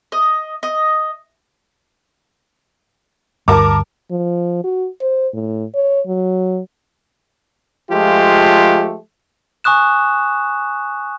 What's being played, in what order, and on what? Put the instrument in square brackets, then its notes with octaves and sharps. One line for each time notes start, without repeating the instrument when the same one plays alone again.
[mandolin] D#5
D#5
[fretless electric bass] D2 G2 [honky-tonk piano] A#4 A5 D6
[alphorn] F3
F#4
C5
A2
C#5
F#3
[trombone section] F3 G#3 A3 F4 G4
[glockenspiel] G#5 C#6 D#6 F#6 E7